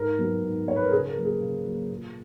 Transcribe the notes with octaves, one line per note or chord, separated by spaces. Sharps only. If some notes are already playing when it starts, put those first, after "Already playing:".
Already playing: G#2 A#4
F#3 B3
G#2
F#3 B3 C#5
B4
A#4
C#3 G#4
A#4
F#3 A#3
G#4
C#3
F#3 A#3
A#2